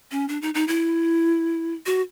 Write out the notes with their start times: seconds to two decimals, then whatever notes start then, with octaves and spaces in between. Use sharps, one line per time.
0.11 C#4
0.29 D4
0.42 D#4
0.54 D#4
0.68 E4
1.86 F#4